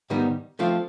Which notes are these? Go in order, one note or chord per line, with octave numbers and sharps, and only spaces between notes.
G#2 D#3 G3 B3 D#4
F3 A3 C4 F4